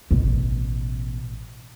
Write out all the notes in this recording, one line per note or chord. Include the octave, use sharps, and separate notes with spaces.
A1 B2